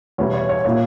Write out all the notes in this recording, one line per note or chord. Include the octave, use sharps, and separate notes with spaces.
E2 B2 G3 B3 C#5
C#5
C#5
A#2 A#3 E4 C#5